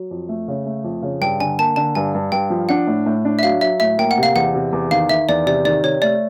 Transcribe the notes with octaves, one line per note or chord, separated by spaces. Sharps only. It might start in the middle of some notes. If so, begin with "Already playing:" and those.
Already playing: F#3
F2
A3
C#3
A3
F2
C#3
G2 G5
D3 G#5
A#3 A5
D3 A5
G2 G#5
G2
G2 G5
F3
D4 F#5
A2
A2
D4
E5
F#3 F5
F#3 E5
A2 E5
A#3 G5
F#5
C3
F5
E2 F#5
C3
E2
D#3 F5
D#3 E5
E2 D5
C3 D5
D#3 D5
C3 C#5
A3 D5